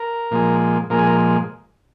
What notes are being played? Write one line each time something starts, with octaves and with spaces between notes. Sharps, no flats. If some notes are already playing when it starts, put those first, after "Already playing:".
Already playing: A#4
A#2 F3 G#3
A#2 F3 G#3 A#4
G#4
A#4